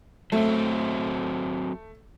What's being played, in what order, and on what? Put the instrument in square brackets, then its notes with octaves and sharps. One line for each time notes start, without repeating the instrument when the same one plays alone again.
[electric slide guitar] F#3 C4 [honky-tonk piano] A3